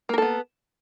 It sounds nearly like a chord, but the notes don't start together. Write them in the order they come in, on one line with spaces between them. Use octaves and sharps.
A#3 A#4 A4 B3